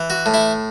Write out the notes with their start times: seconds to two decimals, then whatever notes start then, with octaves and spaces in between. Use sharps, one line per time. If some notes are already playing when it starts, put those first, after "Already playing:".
Already playing: E3
0.10 F#4
0.26 A2
0.34 E4